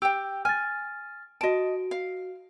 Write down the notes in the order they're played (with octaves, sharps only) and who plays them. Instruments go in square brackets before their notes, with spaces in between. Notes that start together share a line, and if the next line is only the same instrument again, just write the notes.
[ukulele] G4 G5 [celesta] E6
[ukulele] G#5 [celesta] F6 A6
[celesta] F#4 D7 [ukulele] D#5 A5
[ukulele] F5